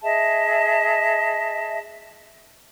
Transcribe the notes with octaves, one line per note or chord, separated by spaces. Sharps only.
G#4 D#5 E5 A5